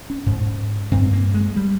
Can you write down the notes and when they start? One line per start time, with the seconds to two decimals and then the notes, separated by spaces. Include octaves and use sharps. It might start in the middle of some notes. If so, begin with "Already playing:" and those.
0.10 C#4
0.26 G#2
0.91 G2 C4
1.13 A#3
1.34 G#3
1.56 G3